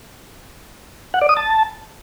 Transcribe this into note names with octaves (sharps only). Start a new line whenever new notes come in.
F#5
D5
D#6
A5